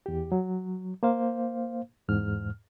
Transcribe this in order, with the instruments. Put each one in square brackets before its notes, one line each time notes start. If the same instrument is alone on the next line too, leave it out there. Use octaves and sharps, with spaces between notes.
[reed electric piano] E2 G4
F#3
A#3 C5 F5
E2 G#2 F6